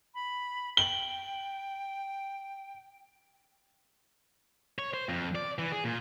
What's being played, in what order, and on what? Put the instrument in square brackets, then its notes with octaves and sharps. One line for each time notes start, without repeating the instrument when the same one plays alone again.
[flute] B5
[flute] G5 [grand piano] F#7 G7
[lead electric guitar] C#5
C5
F2
D5
E3
G#4
A#2